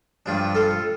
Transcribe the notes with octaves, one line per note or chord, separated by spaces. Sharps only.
G2 F3 D4
F4 A4